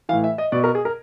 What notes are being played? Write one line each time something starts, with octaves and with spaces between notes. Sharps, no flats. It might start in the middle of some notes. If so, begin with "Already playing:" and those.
A2 E3 F5
E5
D#5
B2 D5
A#4
G#4
A#4